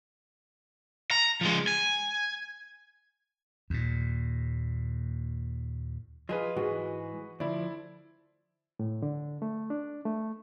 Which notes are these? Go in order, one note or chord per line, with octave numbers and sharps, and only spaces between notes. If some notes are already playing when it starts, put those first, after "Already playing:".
A#5
F3 G#3
G#5
D#2 A#2
F3 F4 G#4 B4 D#5
G#2 E3 G#3 F#4 G#4
D2 F3 E4 D5
A2
D3
A3
D4
A3